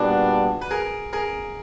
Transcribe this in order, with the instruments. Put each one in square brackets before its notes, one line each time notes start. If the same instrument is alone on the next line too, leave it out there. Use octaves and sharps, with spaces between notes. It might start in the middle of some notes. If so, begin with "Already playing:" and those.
Already playing: [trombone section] A#2 G3 B3 D4 [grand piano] F#4 G#4
[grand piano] B4
G#4 A#4
G#4 A#4